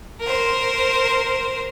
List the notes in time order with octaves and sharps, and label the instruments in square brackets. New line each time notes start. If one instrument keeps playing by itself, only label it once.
[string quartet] A#4 C5